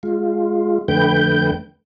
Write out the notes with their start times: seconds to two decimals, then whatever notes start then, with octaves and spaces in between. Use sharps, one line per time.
0.03 G#3 F4
0.88 F2 D3 A3 B4 G5 G6